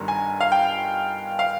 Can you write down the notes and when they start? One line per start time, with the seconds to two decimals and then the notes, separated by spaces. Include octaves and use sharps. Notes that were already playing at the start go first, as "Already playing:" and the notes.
Already playing: G1 G2 D#3 G3 A#5
0.08 G#5
0.41 F5
0.52 G5
1.39 F5